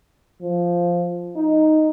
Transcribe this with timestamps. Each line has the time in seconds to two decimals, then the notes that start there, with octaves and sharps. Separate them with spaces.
0.42 F3
1.36 D#4